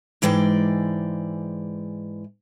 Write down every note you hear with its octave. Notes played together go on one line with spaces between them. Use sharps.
G#2 E3 G#3 D5 G5